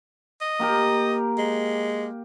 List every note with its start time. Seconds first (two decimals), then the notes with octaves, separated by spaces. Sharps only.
0.41 D#5
0.59 A#3 G4 A#4
1.38 G#3